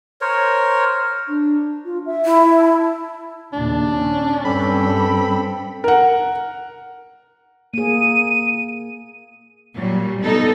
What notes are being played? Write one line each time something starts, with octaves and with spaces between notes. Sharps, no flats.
A#4 C5 C#5
D4
F4
E5
E4
A5
D#2 A#2 C#3 D4
C#4
G2 C4 A4 G5 B5
A#4 F#5
A#3 G#4 D#7
A#2 F#3 G3
B2 B3 D#4 A4